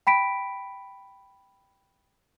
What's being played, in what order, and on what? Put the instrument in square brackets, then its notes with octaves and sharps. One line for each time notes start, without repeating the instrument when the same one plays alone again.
[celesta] G5 B5 B6 D7